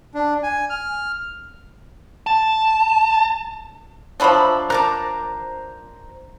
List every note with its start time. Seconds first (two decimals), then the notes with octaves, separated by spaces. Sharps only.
0.14 D4
0.43 G#5
0.70 F6
2.27 A5
4.20 F3 F#3 D4 C5 E5 B5
4.70 A#4 C5 A5 A#5 D6 F#6